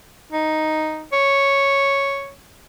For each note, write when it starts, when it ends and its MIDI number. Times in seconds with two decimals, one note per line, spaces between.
0.32 1.05 63
1.13 2.33 73